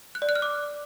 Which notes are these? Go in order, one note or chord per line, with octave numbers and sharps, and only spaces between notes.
F#6
D5
F#6
F6
D6